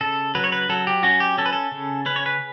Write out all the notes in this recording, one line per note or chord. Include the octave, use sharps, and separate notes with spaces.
C#3 A4
F#3 B4
C#5
B4
F#3 A4
G4
C#4 F#4
G4
C#4 A4
B4
A4
C#3
C#4 B4
C#5
B4